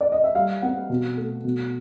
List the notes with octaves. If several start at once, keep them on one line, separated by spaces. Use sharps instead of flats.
D5
D#5
E5
G3 F5
C4 F#5
B2
A3
B2